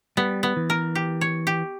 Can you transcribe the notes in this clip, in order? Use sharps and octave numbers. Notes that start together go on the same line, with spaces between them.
G3 B3
B3
E3
A#4
G4
C#5
G4